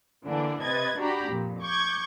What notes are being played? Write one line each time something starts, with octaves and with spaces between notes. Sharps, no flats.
D3 E3 A#3 D4
C3 B4 D#5 G#6 A6
D4 F#4 G4 A#5 B5
F2 A#2
C#6 D6 G6 G#6